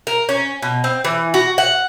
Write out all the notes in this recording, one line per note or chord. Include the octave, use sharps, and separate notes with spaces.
A#4
C#4
B2
C4
E3
F#4
F#5